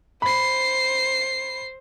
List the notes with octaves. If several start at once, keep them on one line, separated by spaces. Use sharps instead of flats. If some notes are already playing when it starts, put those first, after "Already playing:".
C5 B5 C7